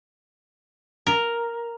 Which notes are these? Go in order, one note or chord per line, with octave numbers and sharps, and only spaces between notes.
A#4